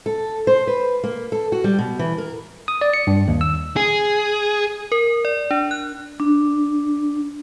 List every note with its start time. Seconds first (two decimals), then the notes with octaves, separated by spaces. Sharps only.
0.06 A4
0.47 C5
0.67 B4
1.04 A#3
1.32 A4
1.52 F#4
1.64 G3
1.79 B2
1.99 E3
2.18 A#4
2.68 D#6
2.81 D5
2.94 C#7
3.07 G2
3.28 D#2
3.41 E6
3.77 G#4
4.92 A#4
5.25 D5
5.51 D4
5.71 F#6
6.20 D4